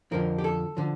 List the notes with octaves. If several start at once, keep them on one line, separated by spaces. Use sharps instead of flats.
F2 D3 F3 A#4
G4
A4
D3 F3